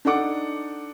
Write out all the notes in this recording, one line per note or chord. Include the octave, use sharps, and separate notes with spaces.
D4 D#4 A4 F#5 D6